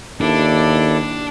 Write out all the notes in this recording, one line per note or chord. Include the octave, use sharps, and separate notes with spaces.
D#2 D4 E4 A4 D5